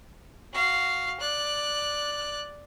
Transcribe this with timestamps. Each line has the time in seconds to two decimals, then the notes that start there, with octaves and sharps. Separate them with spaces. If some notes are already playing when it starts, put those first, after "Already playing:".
0.53 F#4 F5
1.20 D5 F#6